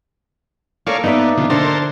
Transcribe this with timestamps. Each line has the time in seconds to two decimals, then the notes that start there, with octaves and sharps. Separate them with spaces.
0.87 A#3 A4 A#4 C#5 D5 F5
1.04 B3 D#4 D5 E5
1.38 B2 D3 F3
1.50 D3 A4 A#4 C5 A5